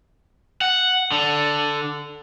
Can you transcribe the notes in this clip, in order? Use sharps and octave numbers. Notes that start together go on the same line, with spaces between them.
F#5
D3